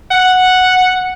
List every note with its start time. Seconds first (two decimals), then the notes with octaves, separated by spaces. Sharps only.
0.11 F#5